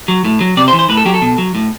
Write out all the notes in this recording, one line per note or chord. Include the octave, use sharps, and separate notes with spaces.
F#3
A2
F#3
C3 D5
C5
E3
C5
A2 B4
A4
F#3 G4
A4
B2
F#3
A2